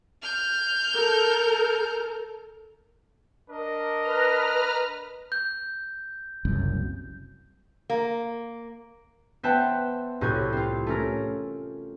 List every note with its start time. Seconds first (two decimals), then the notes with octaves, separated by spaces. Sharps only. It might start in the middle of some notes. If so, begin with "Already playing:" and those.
0.22 F6 G6
0.93 A4 A#4
3.50 D4 A#4 D#5
4.01 B4 A#5 F6
5.32 G6
6.45 F#1 C2 F#2
7.90 A#3
9.43 B3 C5 E5 F#5 G5 A5
10.21 C2 A2 F#4 G6 G#6
10.53 C4 F4
10.87 A3 C#4 A#4